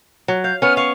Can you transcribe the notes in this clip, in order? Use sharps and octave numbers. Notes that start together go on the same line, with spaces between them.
F#3
F5 G6
B3 C#4 F6
F5 C#6